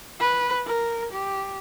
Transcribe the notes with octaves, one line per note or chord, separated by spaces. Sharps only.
B4
A#4
G4